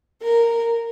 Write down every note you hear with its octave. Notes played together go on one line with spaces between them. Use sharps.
A#4